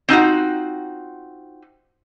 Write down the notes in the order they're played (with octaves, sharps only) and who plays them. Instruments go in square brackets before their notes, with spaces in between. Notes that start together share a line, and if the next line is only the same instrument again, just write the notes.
[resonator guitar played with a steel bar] C4 D#4 F4 F#4